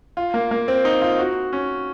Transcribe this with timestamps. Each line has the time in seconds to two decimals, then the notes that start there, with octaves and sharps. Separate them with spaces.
0.17 F4
0.34 A#3
0.51 A#3
0.68 C4
0.85 D#4
1.01 F4
1.19 F#4
1.53 C#4